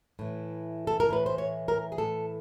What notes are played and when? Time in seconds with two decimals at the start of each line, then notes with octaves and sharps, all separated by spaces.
0.19 A2 E3
0.87 A4
1.00 A#4
1.09 A2 E3 B4
1.26 C5
1.38 C#5
1.68 A#4
1.92 G#4
1.98 A2 E3 A4